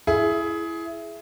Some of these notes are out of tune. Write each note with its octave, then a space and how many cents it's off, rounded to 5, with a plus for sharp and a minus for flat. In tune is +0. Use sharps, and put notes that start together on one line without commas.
E4 +15 G#4 +20